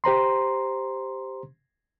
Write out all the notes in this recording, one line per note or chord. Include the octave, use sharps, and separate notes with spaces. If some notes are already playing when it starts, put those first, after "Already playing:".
G4 C5 A#5 C6